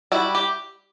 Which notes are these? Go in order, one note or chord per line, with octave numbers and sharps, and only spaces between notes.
G3 E4 F#4
G4